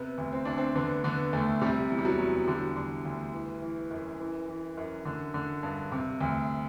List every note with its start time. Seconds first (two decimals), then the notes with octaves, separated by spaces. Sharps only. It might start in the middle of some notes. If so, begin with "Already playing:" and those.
Already playing: C3 B3
0.18 D2
0.33 C4
0.45 D2 D4
0.58 C4
0.75 D3 B3
1.04 D3 B3
1.33 D2 A3
1.62 C3 G3
1.90 E2
1.98 G3
2.05 F#3
2.18 E2
2.48 D3 G3
2.76 D3
3.05 D2
3.33 E3
3.62 E3
3.91 F#2
4.20 E3
4.48 E3
4.77 F#2
5.05 D3
5.34 D3
5.63 G2
5.92 C3
6.21 D2